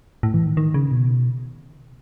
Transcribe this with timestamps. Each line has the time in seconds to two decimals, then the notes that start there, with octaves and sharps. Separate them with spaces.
0.23 A2
0.34 E3
0.46 D#3
0.57 D#3
0.74 C#3
0.92 B2